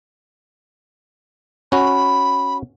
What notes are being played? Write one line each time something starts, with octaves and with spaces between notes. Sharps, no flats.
C#4 F#4 B5